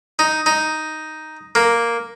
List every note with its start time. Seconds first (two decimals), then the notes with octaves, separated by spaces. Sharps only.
0.19 D#4
0.46 D#4
1.55 A#3